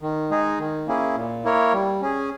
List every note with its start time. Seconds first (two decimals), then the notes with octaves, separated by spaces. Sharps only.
0.02 D#3
0.30 G#3 D#4 G#4
0.59 D#3
0.87 A#3 C#4 E4 G#4
1.16 A#2
1.44 A#3 E4 A#4 C#5
1.73 G3
2.01 C#4 G#4